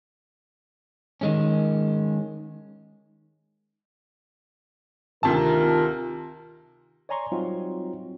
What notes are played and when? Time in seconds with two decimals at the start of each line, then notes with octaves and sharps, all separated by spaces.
1.21 D#3 G#3 C#4
5.23 D2 C3 D#3 F4 A#4 A5
7.09 C#5 D5 G#5 A#5 C6 C#6
7.32 F#3 G3 C4 D#4 F4 F#4